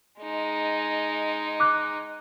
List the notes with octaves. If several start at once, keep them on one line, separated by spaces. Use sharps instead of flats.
G#3 D#4
D6 F#6